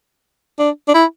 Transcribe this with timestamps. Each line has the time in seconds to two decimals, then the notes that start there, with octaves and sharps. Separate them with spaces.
0.59 D4
0.88 D4
0.94 E4